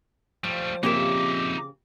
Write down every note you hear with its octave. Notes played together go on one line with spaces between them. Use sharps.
F3 G3 A3
F2 A#2 C#3 D#4 G4 A#4 E5 D6